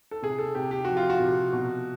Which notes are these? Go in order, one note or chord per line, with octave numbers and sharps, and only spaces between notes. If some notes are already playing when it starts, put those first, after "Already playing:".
A4
C3 G#4
A4
C3 G4
G4
F3 F#4
F4
F#4
C3
B2